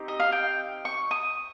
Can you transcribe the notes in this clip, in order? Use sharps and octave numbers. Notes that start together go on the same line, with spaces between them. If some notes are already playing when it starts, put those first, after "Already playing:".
Already playing: C4 D#4 G4
D#5
F5
G5
C#6
D#6